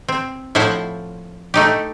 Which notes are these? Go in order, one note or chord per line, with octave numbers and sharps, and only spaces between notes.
C4
A2 F3 E4 C5 F#5
A3 D#4 G4